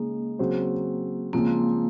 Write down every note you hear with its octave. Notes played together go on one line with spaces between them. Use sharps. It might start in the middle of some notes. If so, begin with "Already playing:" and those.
Already playing: C#3 G#3 A#3 D#4
C#3 F#3 C4 F#4 C5
C#3 F3 G#3 A#3 C4